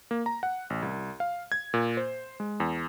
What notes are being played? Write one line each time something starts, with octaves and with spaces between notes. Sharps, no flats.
A#3
A#5
F#5
A1
C2
F5
G#6
A#2
C5
G#3
E2